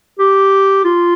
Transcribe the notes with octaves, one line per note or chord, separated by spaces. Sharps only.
G4
F4